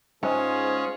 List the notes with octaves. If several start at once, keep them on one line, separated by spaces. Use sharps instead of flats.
G#2 G#3 C#4 F4 G#4 C5